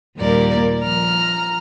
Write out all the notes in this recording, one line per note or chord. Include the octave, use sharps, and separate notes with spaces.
D#2 A#2 G3 A#3 A#4 D5
F3 A#5 F6